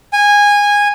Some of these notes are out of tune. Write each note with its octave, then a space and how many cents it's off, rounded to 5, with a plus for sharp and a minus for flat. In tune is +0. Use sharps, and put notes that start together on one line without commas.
G#5 -15